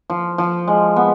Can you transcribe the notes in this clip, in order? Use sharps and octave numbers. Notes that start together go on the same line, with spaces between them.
F3
F3
G#3
B3